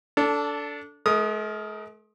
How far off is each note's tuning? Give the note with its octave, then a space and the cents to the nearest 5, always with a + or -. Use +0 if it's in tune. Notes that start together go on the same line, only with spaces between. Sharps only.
D4 -20 A4 +5
G#3 +45 A#4 +0 D#6 +0